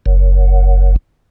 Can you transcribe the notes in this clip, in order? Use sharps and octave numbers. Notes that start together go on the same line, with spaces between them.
F#1